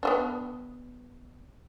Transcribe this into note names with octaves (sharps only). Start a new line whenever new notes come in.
B3 C#4 D4